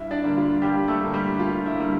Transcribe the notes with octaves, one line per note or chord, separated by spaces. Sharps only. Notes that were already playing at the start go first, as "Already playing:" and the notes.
Already playing: G2 E4 E5
D4 D5
D3 G3 A#3
F4
G2 G3 G4
A3 A4
D3 G3 A#3
G3 G4
G2 F4
E4
D3 G3 A#3